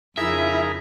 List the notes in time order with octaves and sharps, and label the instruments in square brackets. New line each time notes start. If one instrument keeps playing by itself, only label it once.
[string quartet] F2 C#3 F3 [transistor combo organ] D#4 G#4 A#4 [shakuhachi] E4 [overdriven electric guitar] E5